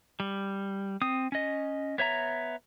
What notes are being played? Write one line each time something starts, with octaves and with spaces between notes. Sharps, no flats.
G3
C4 D#6
C#4 D#5
B3 C#5 E5 A#5